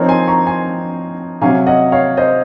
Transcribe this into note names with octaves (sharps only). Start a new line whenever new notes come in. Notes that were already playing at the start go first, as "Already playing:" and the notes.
Already playing: F3 C4 D#4 A#4 C#5
G#5 C6
A#5 C#6
G#5 C6
C3 F#3 C#4 F5 G#5
D#5 F#5
C#5 F5
C5 D#5